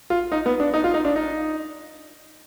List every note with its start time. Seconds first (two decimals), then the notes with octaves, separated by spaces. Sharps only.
0.10 F4
0.32 D#4
0.46 B3
0.60 D4
0.74 D#4
0.84 F4
0.94 D#4
1.05 D4
1.16 D#4